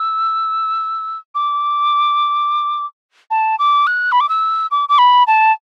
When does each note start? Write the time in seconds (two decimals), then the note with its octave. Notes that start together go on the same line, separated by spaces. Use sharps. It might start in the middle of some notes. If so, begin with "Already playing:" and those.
Already playing: E6
1.35 D6
3.31 A5
3.59 D6
3.87 F#6
4.12 B5
4.20 D6
4.29 E6
4.71 D6
4.89 D6
4.98 B5
5.27 A5